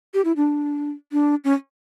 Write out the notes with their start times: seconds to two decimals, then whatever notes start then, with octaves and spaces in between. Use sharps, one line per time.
0.14 G4
0.25 E4
0.36 D4
1.12 D4
1.44 C#4